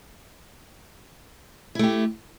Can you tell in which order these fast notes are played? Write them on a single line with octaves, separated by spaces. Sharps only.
E4 A3 G4